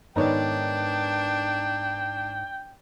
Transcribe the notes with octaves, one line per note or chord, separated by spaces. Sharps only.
G#2 D#3 B3 D4 D#4 C#5 D5 G5